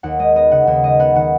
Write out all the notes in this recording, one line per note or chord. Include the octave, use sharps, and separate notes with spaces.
D#2 F#5
G#3 D#5
B3 D#5
C#3 F#5
D#2 F#5
G#3 D#5
B3 F#5
D#3 F#5